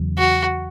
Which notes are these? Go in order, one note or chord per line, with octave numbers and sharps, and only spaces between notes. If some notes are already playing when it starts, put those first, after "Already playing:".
Already playing: E2 C#3 F#3
F#4